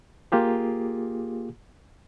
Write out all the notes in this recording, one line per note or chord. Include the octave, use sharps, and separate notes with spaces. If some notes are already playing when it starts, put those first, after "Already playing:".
A#3 F4 G4 G#4